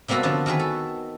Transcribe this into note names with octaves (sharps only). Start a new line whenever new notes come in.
C3 G3 A#3 B3 F#4 A4
D3 F3 B3 D4
D#3 F#4 G#4 B4
A4